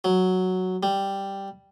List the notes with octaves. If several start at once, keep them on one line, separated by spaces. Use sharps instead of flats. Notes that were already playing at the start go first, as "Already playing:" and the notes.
F#3
G3